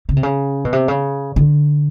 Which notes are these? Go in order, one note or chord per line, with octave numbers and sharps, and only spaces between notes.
C#3
C3
C#3
B2
C3
C#3
D3